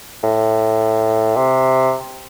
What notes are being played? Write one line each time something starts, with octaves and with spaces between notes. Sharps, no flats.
A2
C3